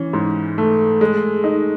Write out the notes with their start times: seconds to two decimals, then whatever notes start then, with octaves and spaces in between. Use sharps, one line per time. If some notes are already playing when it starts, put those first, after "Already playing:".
Already playing: E3 C#4
0.13 G#2
0.58 A3
1.01 G#3
1.44 D#4